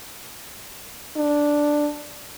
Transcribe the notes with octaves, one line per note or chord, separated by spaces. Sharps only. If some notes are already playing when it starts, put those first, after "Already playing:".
D4